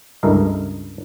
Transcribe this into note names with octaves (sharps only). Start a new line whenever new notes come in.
C#2 G2 E4 A4 A#4 D#5